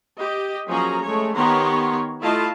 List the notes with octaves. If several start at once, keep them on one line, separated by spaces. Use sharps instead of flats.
G4 D#5
F3 F#3 A#3 C#4 G#4 A#5
G#3 A3 C#5
D#3 B3 G4 C#5 A#5 C6
A3 E4 F4 D#5 F5 A5